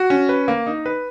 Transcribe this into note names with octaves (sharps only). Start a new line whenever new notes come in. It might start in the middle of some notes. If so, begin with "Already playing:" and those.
Already playing: F#4
C#4
B4
A#3
D#4
B4